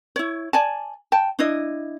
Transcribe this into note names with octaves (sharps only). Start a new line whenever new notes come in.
E4 C#5
D5 G#5 A5
G5 A5
D4 E4 D#5